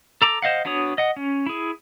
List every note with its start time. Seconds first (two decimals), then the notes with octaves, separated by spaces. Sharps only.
0.22 A4 A#5 D6
0.42 C5 D#5 F5 F#5
0.65 B3 D4 F#4 C#5 D#6
0.98 D#5 F#5
1.16 C#4
1.46 E4 G#4